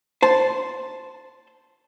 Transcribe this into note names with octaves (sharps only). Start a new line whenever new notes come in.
C5 A5